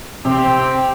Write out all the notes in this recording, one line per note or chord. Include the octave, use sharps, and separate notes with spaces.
C3 C4 G4